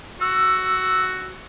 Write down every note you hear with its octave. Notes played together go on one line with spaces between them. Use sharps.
F#4 E6